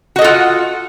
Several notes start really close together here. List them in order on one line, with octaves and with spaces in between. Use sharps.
F#4 D#5 A4 F4 F#5